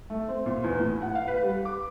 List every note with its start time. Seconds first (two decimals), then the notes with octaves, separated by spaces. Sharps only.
0.10 A3
0.28 C4
0.46 A#2
0.64 E2
0.80 A2
1.01 F#5
1.15 F5
1.28 B4
1.43 G3
1.65 D6